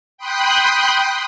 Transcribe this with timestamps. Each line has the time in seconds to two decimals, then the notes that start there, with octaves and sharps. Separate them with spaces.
0.18 G5 B5 C6 D#6 F#6 G6